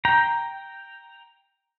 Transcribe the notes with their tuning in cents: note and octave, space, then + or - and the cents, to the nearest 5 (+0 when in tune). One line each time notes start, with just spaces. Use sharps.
G5 +0 A#5 +0